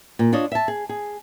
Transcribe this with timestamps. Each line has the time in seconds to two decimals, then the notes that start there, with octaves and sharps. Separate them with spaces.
0.19 A#2
0.33 D4 F4 C#5 D#5
0.52 E5 A5
0.68 G#4
0.89 G#4